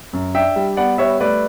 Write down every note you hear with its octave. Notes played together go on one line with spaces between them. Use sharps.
F#2
D4 E5 G5
G3
B3 D5 F#5
G3 C#5 E5
A3 B4 D5